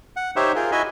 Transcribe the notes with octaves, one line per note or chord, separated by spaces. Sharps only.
F#5
D#4 G4 C5 C#5 E5
F4 G#4 A#4
E4 F#4 D#5 E5 G#5